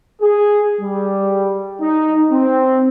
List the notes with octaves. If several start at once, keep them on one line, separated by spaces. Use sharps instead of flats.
G#4
G3
D#4
C4